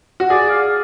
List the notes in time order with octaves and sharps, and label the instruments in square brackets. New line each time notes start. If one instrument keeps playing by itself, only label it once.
[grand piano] F#4
[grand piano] G#4 [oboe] D5
[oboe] F5